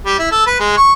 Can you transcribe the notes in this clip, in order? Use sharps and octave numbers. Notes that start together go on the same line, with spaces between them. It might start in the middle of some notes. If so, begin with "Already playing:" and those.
G3
E4
A4
B4
G#3
C#6